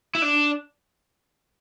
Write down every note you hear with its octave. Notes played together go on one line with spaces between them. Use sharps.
E4
D4